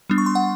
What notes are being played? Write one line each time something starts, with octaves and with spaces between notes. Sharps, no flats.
G3 B3 D4
C#6
C6
F#5